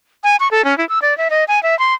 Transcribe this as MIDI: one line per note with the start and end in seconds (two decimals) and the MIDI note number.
0.24 0.36 80
0.40 0.48 85
0.51 0.64 69
0.65 0.77 61
0.78 0.87 64
0.89 0.99 88
1.02 1.16 74
1.18 1.28 76
1.30 1.44 75
1.48 1.62 80
1.63 1.77 76
1.79 1.94 84